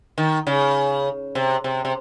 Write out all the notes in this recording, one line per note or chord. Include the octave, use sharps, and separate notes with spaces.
D#3
C#3
C3
C3
C3